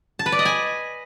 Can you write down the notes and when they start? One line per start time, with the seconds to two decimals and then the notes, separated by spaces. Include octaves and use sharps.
0.19 A5
0.26 B4
0.32 D5
0.39 D#5
0.45 G#5